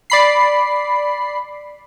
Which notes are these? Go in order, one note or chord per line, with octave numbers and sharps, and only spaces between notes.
D5 B5 C7